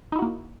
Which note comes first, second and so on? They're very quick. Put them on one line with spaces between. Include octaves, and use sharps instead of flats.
D#4 E4 F#4 A#3